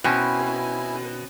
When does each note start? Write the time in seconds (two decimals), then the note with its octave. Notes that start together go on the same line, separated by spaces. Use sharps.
0.04 B2 C4 C#4 E4 G#5